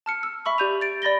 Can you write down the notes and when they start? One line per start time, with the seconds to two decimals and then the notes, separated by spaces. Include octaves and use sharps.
0.06 A5 F6 C#7
0.23 E6
0.45 E5 B5 C#6 E6
0.58 G4 D5 G6 D#7 F7
0.81 A6 D7
1.02 D5 B5 A6 A#6 G7